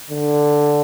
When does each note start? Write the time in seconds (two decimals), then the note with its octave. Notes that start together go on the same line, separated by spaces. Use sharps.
0.10 D3